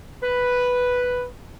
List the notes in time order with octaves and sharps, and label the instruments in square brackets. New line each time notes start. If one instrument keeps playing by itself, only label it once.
[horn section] B4